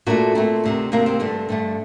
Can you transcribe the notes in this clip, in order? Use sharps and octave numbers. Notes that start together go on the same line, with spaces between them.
A#2 A3 D4 F#4
A#2 A3 C4
D2 C3 D#3
D2 C3 D#3 A#3
C4
G2 D3 A3
G2 D3 A3